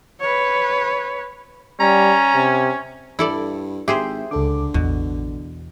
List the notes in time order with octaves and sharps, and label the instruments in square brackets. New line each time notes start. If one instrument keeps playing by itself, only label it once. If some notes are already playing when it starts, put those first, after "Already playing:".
[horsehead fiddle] B4 C#5
[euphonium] G3 [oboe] C#4 [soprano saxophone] A#5
[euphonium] C3
[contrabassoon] G2 [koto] E4 A4 D5
[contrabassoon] G#1 [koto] G4 G#4 C5 [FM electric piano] E5
[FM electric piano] C#2 A4 D6 [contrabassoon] D3
[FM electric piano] A1 [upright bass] E2 [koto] B2